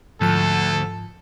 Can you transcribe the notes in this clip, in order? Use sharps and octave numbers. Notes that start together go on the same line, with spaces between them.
D2 G#2 F3 A4 A5